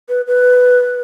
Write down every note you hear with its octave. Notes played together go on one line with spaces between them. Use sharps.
B4
B4